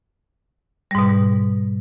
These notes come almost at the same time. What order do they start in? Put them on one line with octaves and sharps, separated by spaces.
G3 G#2 B2